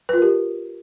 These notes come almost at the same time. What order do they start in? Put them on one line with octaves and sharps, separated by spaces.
B4 F4 A#4 G4